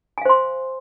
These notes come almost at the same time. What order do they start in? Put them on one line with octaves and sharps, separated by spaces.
G#5 F5 C5 C6